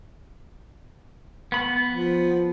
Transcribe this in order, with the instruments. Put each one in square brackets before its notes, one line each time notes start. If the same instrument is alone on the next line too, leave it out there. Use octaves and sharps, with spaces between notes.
[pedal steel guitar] B3 B5
[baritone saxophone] F3